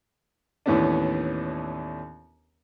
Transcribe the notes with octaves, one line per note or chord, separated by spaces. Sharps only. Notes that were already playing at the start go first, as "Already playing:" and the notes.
D#2 A2 E3 B3 C#4 D4